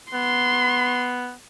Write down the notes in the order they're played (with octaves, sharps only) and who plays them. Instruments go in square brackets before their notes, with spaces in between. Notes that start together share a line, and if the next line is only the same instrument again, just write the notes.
[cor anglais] B3 [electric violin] C6